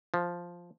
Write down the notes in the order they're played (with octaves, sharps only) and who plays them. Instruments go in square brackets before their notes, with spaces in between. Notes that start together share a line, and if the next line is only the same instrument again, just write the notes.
[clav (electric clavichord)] F3